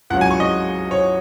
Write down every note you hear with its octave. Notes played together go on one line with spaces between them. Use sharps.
C#2 C#3 F#3 F#5
G#5
C#6
D#5
C#5